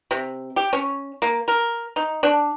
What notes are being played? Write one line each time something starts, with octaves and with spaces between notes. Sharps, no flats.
C3
G4
C#4
A#3
A#4
D#4
D4